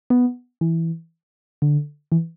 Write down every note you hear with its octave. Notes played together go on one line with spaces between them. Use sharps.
B3
E3
D3
E3